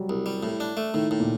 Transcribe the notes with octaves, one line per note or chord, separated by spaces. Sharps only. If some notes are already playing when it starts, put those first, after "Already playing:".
Already playing: F#3 G3
C2
G3
A2
D4
A3
A2 D#3
A2
A#2